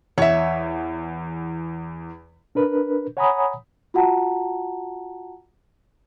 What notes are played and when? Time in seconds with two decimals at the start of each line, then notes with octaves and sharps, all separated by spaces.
0.18 E2 C#5 E5
2.55 D4 A#4 B4
3.17 C#5 F#5 G#5 A#5 B5 D#6
3.94 F4 F#4 F#5 A5 A#5